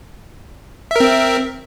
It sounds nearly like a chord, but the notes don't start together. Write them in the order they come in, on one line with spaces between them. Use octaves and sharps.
E5 A#4 C4